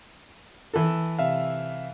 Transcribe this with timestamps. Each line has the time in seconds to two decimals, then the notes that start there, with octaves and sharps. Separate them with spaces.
0.73 E3 A4
1.19 C3 E5 F5